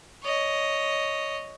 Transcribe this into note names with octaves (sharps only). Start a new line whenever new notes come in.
C#5 D#5